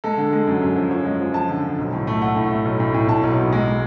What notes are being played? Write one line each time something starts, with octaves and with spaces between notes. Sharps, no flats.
G#3 A4
D3
G#3
F#2
F#2
F3
F3 C#5
G#3
F3
F3 A5
D3
D3
B1
A2
A3
A3 F#5
A2
A3
B1
A2
A2
A2 A5
B1
B1
G#3